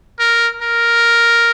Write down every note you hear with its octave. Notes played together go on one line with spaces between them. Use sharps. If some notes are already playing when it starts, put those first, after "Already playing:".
A#4
A#4